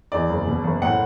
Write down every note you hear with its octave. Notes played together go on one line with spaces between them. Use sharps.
E2 D5
F#1
B2
F#1
A2 F#5